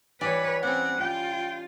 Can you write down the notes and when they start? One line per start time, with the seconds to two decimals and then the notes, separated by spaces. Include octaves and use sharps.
0.21 E3 G3 B4 C#5 D5
0.63 G3 C4 C#4 F#5
1.00 F4 G5